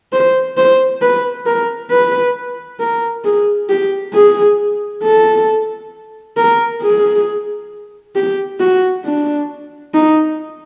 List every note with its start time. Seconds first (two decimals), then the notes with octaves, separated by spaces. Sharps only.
0.13 C5
0.57 C5
1.02 B4
1.46 A#4
1.91 B4
2.80 A#4
3.25 G#4
3.69 G4
4.14 G#4
5.03 A4
6.37 A#4
6.82 G#4
8.16 G4
8.60 F#4
9.05 D4
9.94 D#4